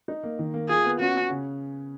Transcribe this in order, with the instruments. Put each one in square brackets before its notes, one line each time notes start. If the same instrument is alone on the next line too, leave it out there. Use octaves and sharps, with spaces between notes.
[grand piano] D#4
A#3
D#3
A#3
[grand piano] F4 [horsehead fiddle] G#4
[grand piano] B3
[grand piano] C#4 [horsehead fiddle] F#4
[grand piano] C#4
C#3